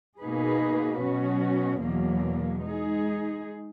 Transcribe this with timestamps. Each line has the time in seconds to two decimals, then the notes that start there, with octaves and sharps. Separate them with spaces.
0.21 B2 A#3 D#4 G#4 B4
1.00 B2 F#3 C#4 F#4
1.81 E2 B2 F#3 A#3
2.62 G#3 D#4 G#4